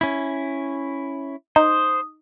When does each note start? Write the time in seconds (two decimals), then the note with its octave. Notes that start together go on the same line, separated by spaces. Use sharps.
0.01 C#4 E4
1.56 D#4 C5 D#6